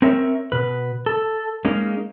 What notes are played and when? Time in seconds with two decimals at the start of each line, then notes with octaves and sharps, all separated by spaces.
0.02 C4 C#4 A#4 C#5 E5
0.52 B2 B4
1.06 A4
1.65 G#3 A#3 C#4 D#4